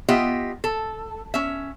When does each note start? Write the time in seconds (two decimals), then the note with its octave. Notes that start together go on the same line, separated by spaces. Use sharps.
0.08 B3 F4 G4 D#5 E5
0.64 A4
1.34 C#4 E5